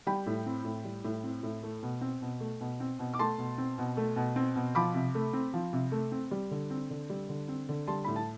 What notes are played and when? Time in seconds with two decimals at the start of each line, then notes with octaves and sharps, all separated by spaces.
0.07 G3 G5 B5
0.26 A2
0.46 C4
0.65 A2
0.84 G3
1.04 A2
1.24 C4
1.43 A2
1.63 A3
1.83 B2
2.01 C4
2.22 B2
2.40 A3
2.61 B2
2.80 C4
2.99 B2
3.14 D6
3.19 A3 A5 C6
3.38 B2
3.58 C4
3.78 B2
3.97 A3
4.16 B2
4.36 C4
4.55 B2
4.75 F3 B5 D6
4.94 C3
5.15 A3
5.33 C4
5.53 F3
5.73 C3
5.92 A3
6.12 C4
6.31 G3
6.51 D3
6.70 C4
6.90 D3
7.10 G3
7.29 D3
7.48 C4
7.69 D3
7.87 G3 A5 C6
8.04 A2 B5
8.16 A5